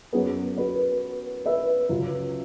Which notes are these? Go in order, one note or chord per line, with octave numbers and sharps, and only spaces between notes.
F#2 F#3 B3 G#4
F#4 B4
B4 E5
C#2 C#3 F#3